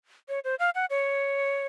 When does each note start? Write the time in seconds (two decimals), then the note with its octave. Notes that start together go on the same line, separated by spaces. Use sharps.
0.29 C#5
0.44 C5
0.59 F5
0.75 F#5
0.90 C#5